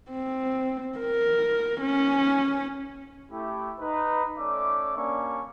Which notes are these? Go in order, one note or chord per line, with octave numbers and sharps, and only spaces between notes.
C4
A#4
C#4
A3 E4 G4
D#4 B4
A3 C#4 D5 E5 D6
G3 A#3 C#4 D4 D5 C#6